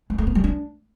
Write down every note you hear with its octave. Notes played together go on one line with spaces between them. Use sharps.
G#3
A3
B3
G3
D4